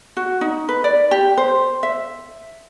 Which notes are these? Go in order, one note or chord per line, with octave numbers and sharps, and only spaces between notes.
F#4
D#4
B4
D5
G4
C5
E5